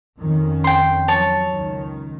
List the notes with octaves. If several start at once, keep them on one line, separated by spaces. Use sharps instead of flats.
F2 D#3 C#4
G5 C6
F3 F#3 C#5 A5
C#2 D#3